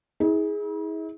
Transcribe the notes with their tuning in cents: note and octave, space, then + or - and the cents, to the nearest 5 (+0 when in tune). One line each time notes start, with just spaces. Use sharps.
E4 -45 G#4 +0